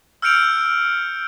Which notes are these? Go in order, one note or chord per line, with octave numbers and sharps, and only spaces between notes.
E6 F6 G6 C#7 D7 F7